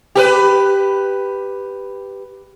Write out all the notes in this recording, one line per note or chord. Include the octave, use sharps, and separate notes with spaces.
G4 A#4 B4